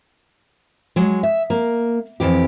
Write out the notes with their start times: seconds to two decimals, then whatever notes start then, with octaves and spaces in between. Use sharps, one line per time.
0.96 F#3 G#3
1.23 E5
1.50 A#3
2.20 F2 E3 G4